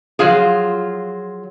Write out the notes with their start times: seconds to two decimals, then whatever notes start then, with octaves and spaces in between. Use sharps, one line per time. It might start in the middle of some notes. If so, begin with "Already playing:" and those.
0.19 F3 F#3 F4 G#4